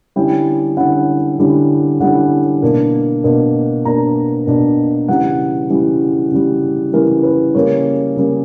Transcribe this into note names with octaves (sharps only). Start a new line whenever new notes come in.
D3 G3 C#4 E4 G5
D3 G3 C#4 E4 F#5
D3 G3 C#4 E4
D3 G3 C#4 E4 F#5
B2 A#3 D4
B2 A#3 D4
B2 A#3 D4 A#5
B2 A#3 D4
C#3 E3 G3 F#5
C#3 E3 G3
C#3 E3 G3
C#3 E3 G3 A#4
B4
C#3 G3 A#3 C#5
C#3 G3 A#3